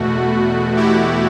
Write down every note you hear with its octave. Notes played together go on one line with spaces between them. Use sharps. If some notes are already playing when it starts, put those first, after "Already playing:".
Already playing: E2 B2 A3 F#4
E4 G4